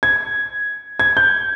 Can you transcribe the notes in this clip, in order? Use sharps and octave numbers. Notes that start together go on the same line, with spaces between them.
G#6
G#6
G6